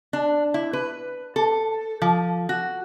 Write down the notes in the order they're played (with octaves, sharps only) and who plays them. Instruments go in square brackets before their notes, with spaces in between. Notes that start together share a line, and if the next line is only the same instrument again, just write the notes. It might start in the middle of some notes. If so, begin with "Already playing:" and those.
[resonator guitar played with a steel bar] D4
E4
B4
A4
F3
F#4